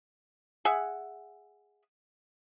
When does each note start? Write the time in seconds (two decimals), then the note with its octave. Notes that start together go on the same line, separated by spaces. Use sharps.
0.65 G#4 E5 F#5